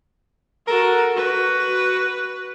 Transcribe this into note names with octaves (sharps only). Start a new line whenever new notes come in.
F#4 A4 A#4
F#4 B4